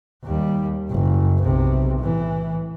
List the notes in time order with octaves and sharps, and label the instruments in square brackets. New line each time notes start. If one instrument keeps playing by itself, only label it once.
[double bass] D#2 G3
F#1
B1 C3
A2 E3